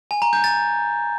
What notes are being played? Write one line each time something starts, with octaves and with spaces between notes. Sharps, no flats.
G#5
A#5
G6
A6